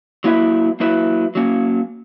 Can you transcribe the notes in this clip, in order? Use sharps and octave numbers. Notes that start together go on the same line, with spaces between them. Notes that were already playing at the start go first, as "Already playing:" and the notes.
F#3 A#3 E4 B4 E5
F#3 A#3 E4 B4 E5
F#3 A#3 C#4